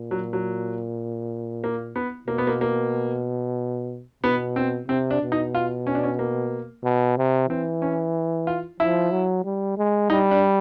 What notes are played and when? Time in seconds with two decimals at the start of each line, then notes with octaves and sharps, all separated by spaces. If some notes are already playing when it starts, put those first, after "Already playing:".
Already playing: A#2
0.11 F#3
0.33 F#3
1.64 A#3
1.96 B3
2.28 B2 A#3
2.38 B3
2.47 A#3
2.61 A#3
4.24 B2 B3
4.56 C4
4.88 C3 C4
5.11 D4
5.22 B2
5.32 D#4
5.55 F4
5.87 C#4
5.95 D4
6.03 C#4
6.19 A#3
6.84 B2
7.17 C3
7.49 E3 C4
7.82 C#4
8.47 F4
8.80 F3 E4
9.12 F#3
9.45 G3
9.78 G#3
10.10 G3 D#4
10.31 D4